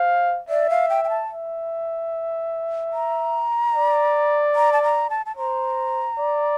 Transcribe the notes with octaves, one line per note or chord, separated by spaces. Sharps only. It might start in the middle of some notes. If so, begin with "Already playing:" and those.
Already playing: C5 F5
D5 E5
F5
G5
G5
A5
E5
A#5
D5
A#5
A5
A#5
A5
A5
C5 A#5
D5